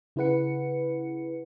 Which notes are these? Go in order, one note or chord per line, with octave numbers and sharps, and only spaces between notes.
C#3 E4 G#4 B4 F#5 C#7